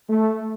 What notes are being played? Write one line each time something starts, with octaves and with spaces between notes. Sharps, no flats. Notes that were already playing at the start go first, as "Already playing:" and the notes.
A3